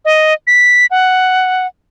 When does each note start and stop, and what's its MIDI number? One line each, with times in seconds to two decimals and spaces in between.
0.05 0.33 75
0.47 0.86 95
0.91 1.67 78